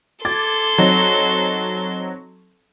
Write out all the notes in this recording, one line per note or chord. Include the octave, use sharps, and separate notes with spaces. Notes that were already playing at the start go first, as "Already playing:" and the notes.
A4 C6 D6 G#6 A6
F#3 C4 D#4